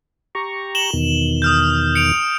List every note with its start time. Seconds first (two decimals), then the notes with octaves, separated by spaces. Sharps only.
0.35 G4 A#5 C#6
0.75 E7 F#7 G7
0.93 E2 B2 D#3
1.42 D#6 F6 G6
1.95 C#7 D7 F7